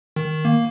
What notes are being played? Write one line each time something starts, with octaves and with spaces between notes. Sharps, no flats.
D#3
A#3